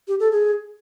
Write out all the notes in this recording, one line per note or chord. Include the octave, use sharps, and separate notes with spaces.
G4
A4
G#4